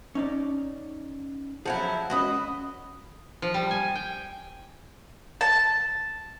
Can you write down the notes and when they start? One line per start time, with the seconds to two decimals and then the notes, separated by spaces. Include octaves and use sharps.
0.15 C#4 D#4 D5
1.66 F3 F#3 E4 G#4 F#5
2.10 C#2 C#3 F#4 B4 D#5
3.42 F3
3.54 G3
3.71 G#5
3.95 G5
5.41 A5